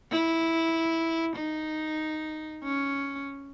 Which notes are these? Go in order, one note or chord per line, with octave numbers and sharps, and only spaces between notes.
E4
D#4
C#4